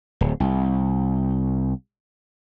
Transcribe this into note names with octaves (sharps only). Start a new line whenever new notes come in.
D1
C2